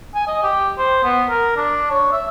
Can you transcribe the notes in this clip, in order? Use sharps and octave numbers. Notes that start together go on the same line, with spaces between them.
G#5
D#5
G4
C5
B3
A#4
D4
C#5
E5